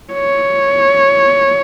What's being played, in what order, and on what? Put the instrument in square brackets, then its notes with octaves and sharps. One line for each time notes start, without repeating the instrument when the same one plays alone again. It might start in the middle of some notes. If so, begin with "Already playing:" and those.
[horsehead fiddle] C#5